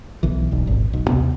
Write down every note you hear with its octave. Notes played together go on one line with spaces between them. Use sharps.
B1 E3
D#1 B1
D#1 G#1
B1
D#2 C3 B3